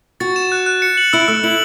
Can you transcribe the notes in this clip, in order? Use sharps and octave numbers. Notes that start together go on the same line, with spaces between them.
F#4 A6
E7
F#6
F#6
C#7
F#7
E4 E6
A3 E6
E4 F#7